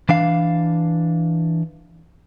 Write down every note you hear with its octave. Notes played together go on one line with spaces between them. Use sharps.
E3 D4 F5